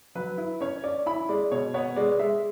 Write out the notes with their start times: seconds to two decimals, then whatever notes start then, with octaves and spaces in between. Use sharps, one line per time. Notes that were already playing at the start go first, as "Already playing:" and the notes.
0.15 F#3 B4
0.38 E4
0.61 C#4 C#5
0.84 C#4 D5
1.06 E4 B5
1.29 G#3 D5
1.52 B2 C#5
1.74 B3 C#5
1.96 G#3 D5
2.19 G#3 E5